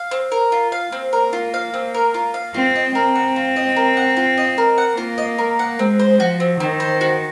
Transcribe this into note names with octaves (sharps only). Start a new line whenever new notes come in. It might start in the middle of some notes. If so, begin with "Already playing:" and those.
Already playing: F5
C4
A#4
F4
F5
A#3 C4
A#4
F4
F5
C4
A#4
F4
F5
C4 F4
D#5
C4 A#4
F#5
F4
D#5
A#4
F#5
F4
D#5
A#4
F#5
A#3 F4
D#5
A#4
F#5
G#3 C4
C5
F3 F#4
C4
D#3 C4
C5
F#4